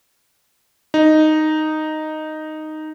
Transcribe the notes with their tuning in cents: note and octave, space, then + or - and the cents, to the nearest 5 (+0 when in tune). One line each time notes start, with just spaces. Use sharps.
D#4 -5